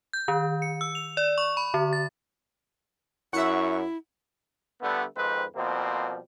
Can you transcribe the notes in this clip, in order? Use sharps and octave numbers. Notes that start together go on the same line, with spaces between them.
G6
D#3
C#7
E6
F7
D5
C#6
B5
D3
A6
F#2 E4 E5 F#5 C#6
D3 G3 A3 B3
F2 G#2 D#3 C4 B4
B2 F3 G3 A#3 C4